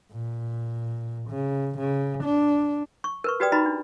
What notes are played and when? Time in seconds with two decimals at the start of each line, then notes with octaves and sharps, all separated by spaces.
0.12 A#2
1.29 C#3
1.79 C#3
2.24 D4
3.04 C#6
3.24 A#4 B4 C#6
3.40 F#4 G4 B4 D5 G5 D#6
3.52 D#4 F#4 B4 D#5 A#5 B5
3.66 D4